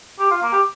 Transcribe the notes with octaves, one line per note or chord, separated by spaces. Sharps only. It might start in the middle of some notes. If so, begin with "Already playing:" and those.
G4
F4
A#3
G4